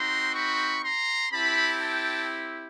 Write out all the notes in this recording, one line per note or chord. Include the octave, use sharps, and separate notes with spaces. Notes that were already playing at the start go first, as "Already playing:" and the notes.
Already playing: C4 D#4 F#4 A#5 C6
B5 C#6
A#5 C6
C4 E4 G4 A5 B5
G5 A5